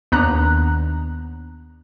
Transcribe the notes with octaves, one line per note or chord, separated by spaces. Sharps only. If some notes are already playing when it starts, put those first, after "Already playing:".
D#2 B3 D4 A#5 F#6